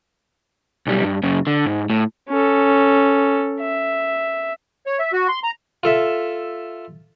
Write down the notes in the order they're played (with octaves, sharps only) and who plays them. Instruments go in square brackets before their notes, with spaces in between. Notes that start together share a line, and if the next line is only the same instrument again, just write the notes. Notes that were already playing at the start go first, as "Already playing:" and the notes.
[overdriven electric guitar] B1 G3
G2
F#2 C#3
D3
G#2
A2
[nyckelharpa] C#4 A4
E5
[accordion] C#5
E5
F#4
C6
A#5
[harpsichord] F4 A4 E5